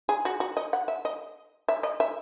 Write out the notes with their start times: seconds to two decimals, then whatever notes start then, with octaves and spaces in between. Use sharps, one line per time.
0.09 G#4
0.25 F#4
0.40 F#4
0.57 D#5
0.73 F#5
0.88 E5
1.05 D#5
1.68 E5
1.83 D#5
2.00 E5